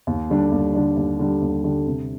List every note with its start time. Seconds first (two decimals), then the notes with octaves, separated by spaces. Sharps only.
0.07 D#2
0.30 D3 G3 D4
0.52 D#2
0.74 D3 G3 D4
0.97 D#2
1.19 D3 G3 D4
1.42 D#2
1.64 D3 G3 D4
1.87 C3